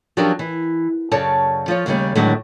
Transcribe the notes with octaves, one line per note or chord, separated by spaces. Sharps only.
F3 F#3 C#4 D4 G4 A#4
E3
F#2 C#3 A4 C#5 D5 A5
F3 F4 C#5
D#2 C#3 E3 G3 A3
A2 D3 D#3 F#3 G#3